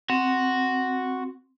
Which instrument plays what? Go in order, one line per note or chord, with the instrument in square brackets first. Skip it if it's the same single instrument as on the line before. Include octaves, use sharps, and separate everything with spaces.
[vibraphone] C4 [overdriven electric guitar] F#4